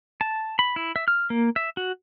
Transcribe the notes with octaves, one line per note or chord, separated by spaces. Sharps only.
A5
B5
E4
E5
F6
A#3
E5
F#4